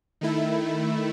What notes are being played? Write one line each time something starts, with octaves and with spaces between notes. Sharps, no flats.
D#3 A3 E4